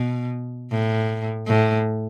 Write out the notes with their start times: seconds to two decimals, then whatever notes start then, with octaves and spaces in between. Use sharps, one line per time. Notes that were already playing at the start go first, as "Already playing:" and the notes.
Already playing: B2
0.71 A2
1.47 A2